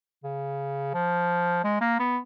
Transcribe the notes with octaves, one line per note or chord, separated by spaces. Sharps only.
C#3
F3
G#3
A#3
B3